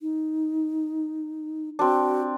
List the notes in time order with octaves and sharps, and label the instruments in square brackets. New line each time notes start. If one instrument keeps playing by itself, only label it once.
[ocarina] D#4
[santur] C4 D4 [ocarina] F#4